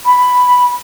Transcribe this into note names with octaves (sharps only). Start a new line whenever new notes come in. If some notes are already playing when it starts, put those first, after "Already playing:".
B5